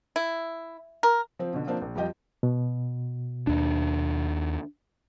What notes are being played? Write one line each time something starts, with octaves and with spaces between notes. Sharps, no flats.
E4
A#4
F3 C4
B2 D3
F3 A#3 C4 D4
A#1
F2 G3 F4 G4 D#5 G5
B2
D#2 D4